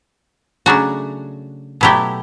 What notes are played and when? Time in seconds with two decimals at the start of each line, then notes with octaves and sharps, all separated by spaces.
0.66 C#3 F#3 A3 D4 F#4
1.81 B2 F#3 A3 E4 G4